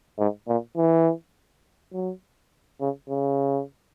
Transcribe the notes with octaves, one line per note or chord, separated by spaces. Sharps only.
G#2
A#2
E3
F#3
C#3
C#3